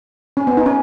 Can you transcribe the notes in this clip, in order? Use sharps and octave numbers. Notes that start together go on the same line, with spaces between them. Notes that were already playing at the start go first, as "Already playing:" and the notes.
C#4
B3
D#4
C#4